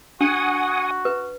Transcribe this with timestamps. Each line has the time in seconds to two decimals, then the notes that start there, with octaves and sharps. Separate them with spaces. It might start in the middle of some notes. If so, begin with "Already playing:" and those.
0.21 D4 F#4 F#5 G#5 D#6
1.05 B4